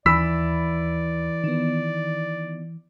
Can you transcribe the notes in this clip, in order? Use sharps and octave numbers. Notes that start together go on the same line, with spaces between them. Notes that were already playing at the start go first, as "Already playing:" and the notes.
D#2 E3 D5 B5 E6 B6
D#3 B3